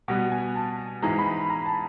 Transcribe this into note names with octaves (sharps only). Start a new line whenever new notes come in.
B2 G3 B3 F#5
G#5
A5
G#2 E3 G#3 A#5
B5
A#5
A5